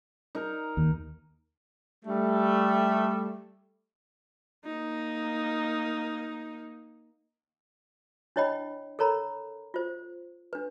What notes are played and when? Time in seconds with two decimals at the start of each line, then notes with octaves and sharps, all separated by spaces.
0.35 D#4 A#4
0.77 D#2
2.05 G3 A3
4.65 A#3 D#4
8.36 D4 E4 C#5 D#5 G5 B5
8.99 A4 A#4 C#5 A#5 B5
9.74 F4 C5
10.53 D4 B4